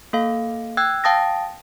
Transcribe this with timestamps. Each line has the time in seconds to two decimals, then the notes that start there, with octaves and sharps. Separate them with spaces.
0.13 A#3 A4 F5
0.77 G5 E6 F#6 G#6
1.04 F5 G5 A5 D#6 A6 A#6